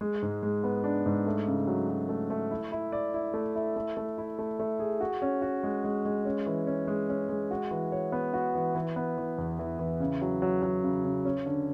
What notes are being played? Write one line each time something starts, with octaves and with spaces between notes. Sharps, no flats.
G#3
G#2
G#3
B3
D4
G#2
A3
C#3
F#3
F#3
A3
A3
E4
E4
D5
E4
A3
E4
A3
A3
E4
A3
A3
G#4
F#4
C#4
F#4
G#3
G#3
G#3
C#4
E3
C#4
G#3
C#4
G#3
F#4
E3
C#5
B3
F#4
E3
E3
B3
E3
E2
E3
E3
C#3
F#3
F#3
F#3
C#3
C#3
C#4
D3